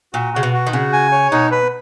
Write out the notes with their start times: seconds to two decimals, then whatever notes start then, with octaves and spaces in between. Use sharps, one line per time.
0.13 A#2 F#4
0.34 C#3 F#4
0.43 B2
0.53 F#4
0.67 D#3
0.73 C#3 F#4
0.93 G#5
1.12 C#5
1.31 B2 D#4
1.51 B4